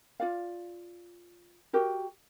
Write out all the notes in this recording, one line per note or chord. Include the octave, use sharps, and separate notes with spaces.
F4 D5 F5
F#4 G4 A#4